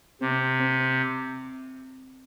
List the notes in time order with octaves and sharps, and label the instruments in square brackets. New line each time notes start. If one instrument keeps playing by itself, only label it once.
[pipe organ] C3 [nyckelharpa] C4
[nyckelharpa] C4